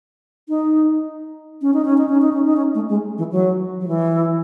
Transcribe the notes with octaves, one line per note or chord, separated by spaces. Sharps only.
D#4
C#4
D#4
C#4
D#4
C#4
D#4
C#4
D#4
C#4
A3
G#3
E3
F#3
F#3
E3